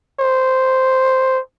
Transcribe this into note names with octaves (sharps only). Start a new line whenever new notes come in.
C5